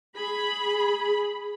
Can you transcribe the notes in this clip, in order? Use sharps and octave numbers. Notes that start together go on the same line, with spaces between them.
G#4 B5